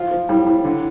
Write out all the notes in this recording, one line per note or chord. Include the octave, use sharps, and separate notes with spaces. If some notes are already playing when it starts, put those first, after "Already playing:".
Already playing: F3 F4
F3
A2 G3
A2
D3